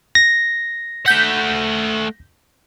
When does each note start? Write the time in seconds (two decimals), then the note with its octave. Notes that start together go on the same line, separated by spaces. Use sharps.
0.15 A#6
1.06 A3 F#5 G6 B6